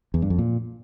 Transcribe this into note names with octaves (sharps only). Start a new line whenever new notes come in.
E2
G2
F2
A#2